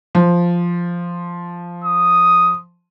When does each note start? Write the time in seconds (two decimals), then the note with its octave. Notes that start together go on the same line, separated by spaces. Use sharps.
0.15 F3
1.84 D#6